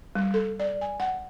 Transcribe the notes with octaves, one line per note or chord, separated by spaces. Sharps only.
G3
A4
D5
G#5
F#5